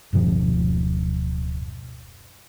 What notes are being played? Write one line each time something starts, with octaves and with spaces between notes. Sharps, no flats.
D1 F#2 B2 F3